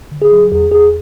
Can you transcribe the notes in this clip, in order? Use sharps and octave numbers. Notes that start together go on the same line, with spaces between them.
D3
G#4
F#3
E2 G#4
E2 G#4